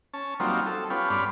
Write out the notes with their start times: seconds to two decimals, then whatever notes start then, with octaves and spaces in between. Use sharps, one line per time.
0.13 C#4 A5
0.40 F#3 G3 A#3 C4 D#4 F4
0.66 A4
0.90 B3 C#4 F4 G4
1.10 G2 C#4 D5 B5 C6 F6